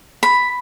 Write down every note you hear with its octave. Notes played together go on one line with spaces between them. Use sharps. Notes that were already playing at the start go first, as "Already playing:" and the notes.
B5